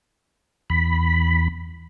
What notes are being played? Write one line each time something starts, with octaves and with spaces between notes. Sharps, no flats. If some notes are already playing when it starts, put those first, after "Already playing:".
E2 B5